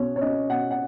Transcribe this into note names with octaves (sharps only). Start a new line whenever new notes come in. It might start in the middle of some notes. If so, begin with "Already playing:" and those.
Already playing: B2 C#4 C#5
C#5
C#4 D#5
B2 F#5
F#5